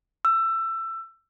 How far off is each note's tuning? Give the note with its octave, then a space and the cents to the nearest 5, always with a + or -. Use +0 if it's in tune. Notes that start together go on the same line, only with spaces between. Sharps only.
E6 +20